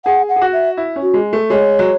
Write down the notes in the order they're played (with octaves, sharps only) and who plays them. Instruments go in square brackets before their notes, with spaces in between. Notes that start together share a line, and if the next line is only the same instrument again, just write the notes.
[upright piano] G#4 [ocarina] F#5
[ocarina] F#5
[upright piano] G#4
F#4
[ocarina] E5
[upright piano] E4
C#4
[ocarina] F#4
[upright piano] G#3
A3
[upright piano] G#3 [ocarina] C#5
[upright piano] F#3